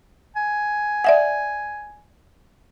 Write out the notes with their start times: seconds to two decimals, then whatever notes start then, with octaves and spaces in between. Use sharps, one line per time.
0.36 G#5
1.05 D5 E5 F#5